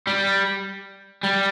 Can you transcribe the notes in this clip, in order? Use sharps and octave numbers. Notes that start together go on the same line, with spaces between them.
G3
G3